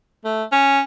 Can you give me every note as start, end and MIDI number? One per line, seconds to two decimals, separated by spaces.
0.24 0.43 57
0.52 0.80 61